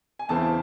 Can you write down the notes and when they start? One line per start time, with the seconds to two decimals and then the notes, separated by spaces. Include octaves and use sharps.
0.19 G#5
0.29 E2 C#3 E3 C4 E4 A5